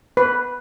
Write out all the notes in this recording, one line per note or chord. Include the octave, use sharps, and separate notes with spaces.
B4